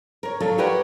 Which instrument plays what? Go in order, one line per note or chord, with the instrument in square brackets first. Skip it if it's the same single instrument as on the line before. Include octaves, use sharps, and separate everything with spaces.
[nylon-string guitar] A#4 C#5
F3 F#3 D4 A4
G4 A#4 B4 C#5 D5 F#5